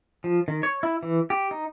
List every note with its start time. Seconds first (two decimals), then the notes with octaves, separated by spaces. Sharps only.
0.24 F3
0.48 D#3
0.63 C#5
0.83 E4
1.03 E3
1.30 G4
1.51 D#4